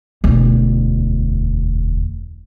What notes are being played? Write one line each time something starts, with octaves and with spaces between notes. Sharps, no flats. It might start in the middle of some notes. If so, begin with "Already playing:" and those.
E1 D2